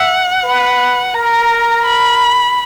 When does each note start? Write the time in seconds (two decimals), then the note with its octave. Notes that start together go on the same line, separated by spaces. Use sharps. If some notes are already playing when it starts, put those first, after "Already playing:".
Already playing: E5 F#5
0.44 B4
1.14 A#4 A#5
1.86 B5